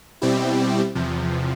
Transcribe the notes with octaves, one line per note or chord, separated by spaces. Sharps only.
B2 G3 C4 E4 G4
E2 C3 F3